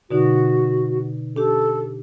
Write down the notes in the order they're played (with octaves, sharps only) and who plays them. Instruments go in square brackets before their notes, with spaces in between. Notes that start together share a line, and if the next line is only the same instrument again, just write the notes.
[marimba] B2 D3 D#4 [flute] F#4
[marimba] D4 G4 [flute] A4